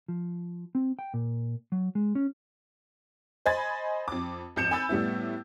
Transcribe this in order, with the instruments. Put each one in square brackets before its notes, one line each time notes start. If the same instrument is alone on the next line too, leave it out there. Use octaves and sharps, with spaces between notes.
[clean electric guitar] F3
C4
G5
A#2
F#3
G#3
C#4
[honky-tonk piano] C5 D#5 G#5 B5 G#6 A6
F2 D6
G#1 F2 G6 C#7 E7
G#5 B5 E6 G6 A6
A2 G3 B3 E4